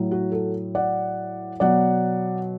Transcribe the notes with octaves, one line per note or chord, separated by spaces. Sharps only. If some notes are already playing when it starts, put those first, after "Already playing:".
Already playing: A2 F#3
F#4
F#4 A4
D5 F#5
B2 F#3 D5 F#5